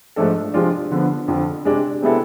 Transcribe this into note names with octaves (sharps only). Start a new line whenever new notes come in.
G#2 F3 A3 D4 A4
C3 F3 G#3 D4 F4
D3 F3 B3
F2 D3 F3
C3 G#3 D4
C3 G#3 B3 E4 A4